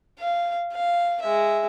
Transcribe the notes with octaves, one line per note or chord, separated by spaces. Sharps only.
F5
F5
G#3 E5